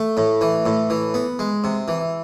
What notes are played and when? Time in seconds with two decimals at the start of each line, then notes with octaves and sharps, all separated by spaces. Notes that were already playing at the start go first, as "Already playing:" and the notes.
Already playing: A3
0.17 A2
0.41 E3
0.66 A2
0.90 E3
1.14 B3
1.39 G#3
1.64 C3
1.88 E3